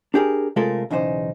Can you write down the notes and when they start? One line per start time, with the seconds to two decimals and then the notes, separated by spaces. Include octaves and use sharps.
0.14 D4 G4 G#4 A#4
0.56 C3 G#3 A3 F4 A4 A#4
0.90 B1 E2 C#3 D#4 C5